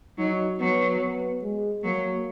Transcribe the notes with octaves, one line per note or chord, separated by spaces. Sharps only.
F#3 D#4
F#3 B3
B3
G#3
F#3 A#3